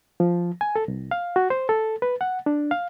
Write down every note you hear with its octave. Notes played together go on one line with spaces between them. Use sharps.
F3
G#5
A4
C2
F5
F#4
C5
A4
B4
F#5
D4
F5